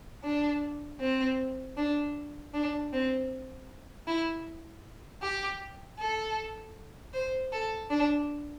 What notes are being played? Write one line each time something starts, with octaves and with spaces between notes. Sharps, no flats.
D4
C4
D4
D4
C4
E4
G4
A4
C5
A4
D4